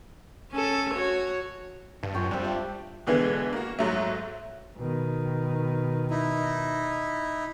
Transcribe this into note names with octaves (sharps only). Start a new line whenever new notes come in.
C#4 A4
F#4 C#5
G2 A5
F#2 F4 C#5 G5
G3 C4 D4
E5
B2 D3 E3 G#3 B3
A#3 F#4
G#2 F#3 A3
B2 D#3
D#4 E4